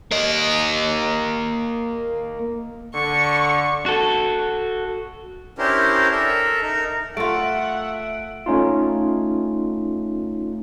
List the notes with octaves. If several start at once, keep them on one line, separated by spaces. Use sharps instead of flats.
A#3 D#5
D3 C#6
F#4 A4
C#4 D4 E4 G4 A#4 C5
A4 A#4 E5
D#4 A#4
A3 F4 E5 F#5 D7
A3 C#4 D#4 F4